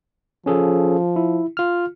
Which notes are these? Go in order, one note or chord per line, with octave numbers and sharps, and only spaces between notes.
F3 C#4 G#4 A4
E4
F4 F6